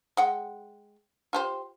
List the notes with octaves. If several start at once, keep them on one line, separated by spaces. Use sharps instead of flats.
G#3 F#5 G5
F4 G4 C5